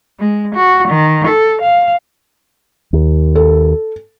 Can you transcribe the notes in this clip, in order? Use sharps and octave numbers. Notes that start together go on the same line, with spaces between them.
G#3
F#4
D#3
A4
F5
D#2
A4